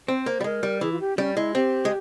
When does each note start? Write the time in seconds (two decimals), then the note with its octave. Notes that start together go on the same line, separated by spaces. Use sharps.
0.08 C4 C5
0.26 A#3
0.41 G3
0.44 G#3 A#4
0.63 G3
0.81 E3 G#4
0.92 F4
1.00 G4
1.17 G3 C#4
1.36 G#3 E4
1.55 C4 G4
1.85 G#3